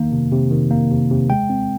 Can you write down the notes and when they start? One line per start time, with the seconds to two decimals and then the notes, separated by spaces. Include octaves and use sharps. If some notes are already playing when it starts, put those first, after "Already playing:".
Already playing: D#3 A#3
0.12 C3
0.32 C3
0.51 D#3
0.71 A#3
0.91 C3
1.10 C3
1.30 G#3 G5
1.50 C4